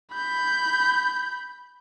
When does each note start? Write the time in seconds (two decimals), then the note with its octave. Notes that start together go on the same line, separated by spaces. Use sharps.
0.13 B5 G6